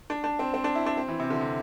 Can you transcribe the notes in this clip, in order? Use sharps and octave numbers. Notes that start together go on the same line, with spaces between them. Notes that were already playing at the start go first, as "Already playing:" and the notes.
D4
D4
C4
C4
D4
E4
D4
C4
E3
C3
D3
C3